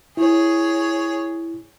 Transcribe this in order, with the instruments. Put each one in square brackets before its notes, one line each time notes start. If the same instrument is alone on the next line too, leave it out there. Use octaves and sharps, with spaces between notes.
[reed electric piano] E4 [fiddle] G#4 C#5